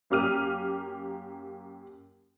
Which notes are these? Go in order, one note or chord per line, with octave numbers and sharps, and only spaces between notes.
F#2 A#3 G4 F6 D#7